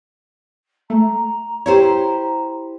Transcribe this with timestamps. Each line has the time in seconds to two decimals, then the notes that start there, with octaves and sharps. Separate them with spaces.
0.90 A3 A#5
1.66 E4 G4 C5 C#5